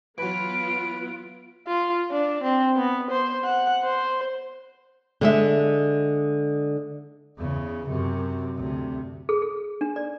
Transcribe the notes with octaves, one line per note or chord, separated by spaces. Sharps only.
E3 F#3 B3 F4 B4 D7
F4
D4
C4
B3
C5
F#5
C5
D3 G#3 E5
E2 C#3
F#2 C3
D2 C3
G#4
G#4
D4
D5